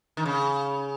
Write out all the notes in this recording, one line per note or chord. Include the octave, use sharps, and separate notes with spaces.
D#3
C#3